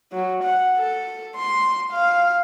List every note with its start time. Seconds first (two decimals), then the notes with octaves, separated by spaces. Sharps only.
0.12 F#3
0.44 F#5
0.78 A4
1.36 C6
1.92 F5